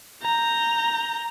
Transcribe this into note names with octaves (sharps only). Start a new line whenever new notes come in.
A#5 G6